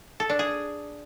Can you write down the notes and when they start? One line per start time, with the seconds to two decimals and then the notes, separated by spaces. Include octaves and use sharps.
0.20 A4
0.30 D4
0.39 G#4